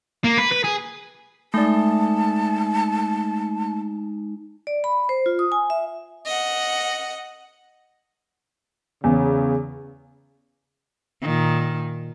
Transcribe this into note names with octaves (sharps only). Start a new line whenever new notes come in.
A#3
B4
B4
G#4
G#3 A3 D#4 D5 A5
D5
B5
C5
F4
D#6
G#5
E5
D#5 F#5
E2 C#3
A#2 D#3